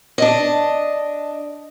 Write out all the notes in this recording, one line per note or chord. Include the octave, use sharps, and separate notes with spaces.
D4 D#5